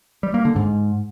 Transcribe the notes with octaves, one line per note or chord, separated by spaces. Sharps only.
G3
A#3
D3
G#2